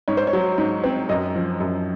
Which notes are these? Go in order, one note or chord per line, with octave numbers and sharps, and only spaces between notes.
G#2 C#5
C5
C#5
F#3
G#2
C4
F#2 D#5
F3
F#2